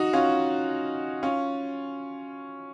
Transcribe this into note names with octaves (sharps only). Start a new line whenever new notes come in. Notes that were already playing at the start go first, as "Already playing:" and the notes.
Already playing: D#4 F#4
C#4 F4
C#4 F4